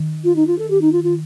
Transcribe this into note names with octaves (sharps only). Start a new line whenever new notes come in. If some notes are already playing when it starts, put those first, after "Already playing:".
Already playing: D#3
F4
D#4
F4
A4
G4
D#4
F4
F4